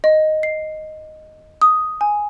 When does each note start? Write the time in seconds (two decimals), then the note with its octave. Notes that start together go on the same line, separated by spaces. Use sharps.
0.04 D#5
0.43 C7
1.62 D#6
2.01 G#5